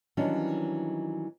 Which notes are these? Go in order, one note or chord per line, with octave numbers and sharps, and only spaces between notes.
D#3 E3 F#3 G3 C#4 D4